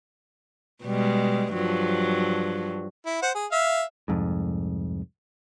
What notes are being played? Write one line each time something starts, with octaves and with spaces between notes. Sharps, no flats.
B2 G3 G#3
G2 F3 F#3
E4
C5 F#5
G#4
E5 F5
C2 F2 G#2